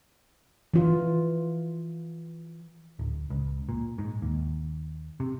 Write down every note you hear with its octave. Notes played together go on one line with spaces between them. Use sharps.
E3 F4
D1
C#2
A#2
G#2
D#2
C3